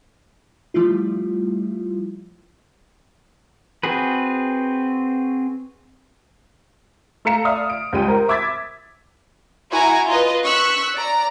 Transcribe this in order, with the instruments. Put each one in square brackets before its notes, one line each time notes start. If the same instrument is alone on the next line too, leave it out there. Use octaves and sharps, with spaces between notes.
[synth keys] F3 G3 A3 E4 F4
[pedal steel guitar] C4 F#4 G#4 B4
[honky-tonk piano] A3 A4 F5 A#5 C#7 E7
D5 E5 F5 D#6 F6
D7
C#2 G3 G#3 G5 D#7
A#4 C5
E5 D6 E6 G#6 A6 B6
[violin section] E4 F#4 G#5 A#5
F4 B4 D#5
C#6 E6 F#6 B6
D5 A#5